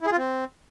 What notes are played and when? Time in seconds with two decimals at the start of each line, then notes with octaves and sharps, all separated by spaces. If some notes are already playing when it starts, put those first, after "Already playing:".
0.01 E4
0.06 G#4
0.12 F4
0.17 C4